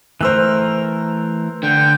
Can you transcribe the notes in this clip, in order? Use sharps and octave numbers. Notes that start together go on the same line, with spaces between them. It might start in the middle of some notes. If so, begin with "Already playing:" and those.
E3 A3 A#4 C5 E6 F#6
D3 G5